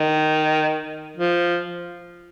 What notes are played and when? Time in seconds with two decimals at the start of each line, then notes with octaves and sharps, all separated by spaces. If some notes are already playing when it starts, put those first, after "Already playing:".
Already playing: D#3
1.17 F3